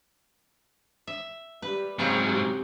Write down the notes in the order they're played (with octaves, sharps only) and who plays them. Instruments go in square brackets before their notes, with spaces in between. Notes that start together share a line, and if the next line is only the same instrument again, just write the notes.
[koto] E5
[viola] G3 G4 [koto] B4
[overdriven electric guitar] G#2 F#3 [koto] C#3 C4 A#5 [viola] G#4 G#5
[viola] G4